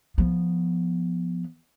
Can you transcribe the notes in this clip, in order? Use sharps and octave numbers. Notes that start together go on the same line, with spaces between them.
F3 B3